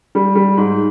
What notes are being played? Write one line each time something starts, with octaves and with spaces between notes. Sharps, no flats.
G3
G3
G#2